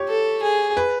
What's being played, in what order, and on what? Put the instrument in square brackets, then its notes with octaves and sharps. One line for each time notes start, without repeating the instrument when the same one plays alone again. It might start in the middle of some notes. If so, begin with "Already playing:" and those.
Already playing: [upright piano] G4 C#5
[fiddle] A4
G#4
[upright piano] B4